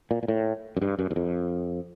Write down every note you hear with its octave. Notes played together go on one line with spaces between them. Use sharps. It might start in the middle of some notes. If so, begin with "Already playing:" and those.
A#2
A#2
A2
F#2
G2
F#2
E2
F2